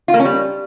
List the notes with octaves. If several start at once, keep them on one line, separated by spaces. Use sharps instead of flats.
F4
A#3
C#4
G3